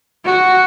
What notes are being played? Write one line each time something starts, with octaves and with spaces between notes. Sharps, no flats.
F#4